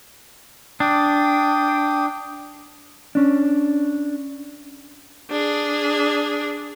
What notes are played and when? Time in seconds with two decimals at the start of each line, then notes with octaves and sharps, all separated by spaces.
0.80 D4 G5 D6 D#6
3.15 C#4 D4
5.31 D4 G#4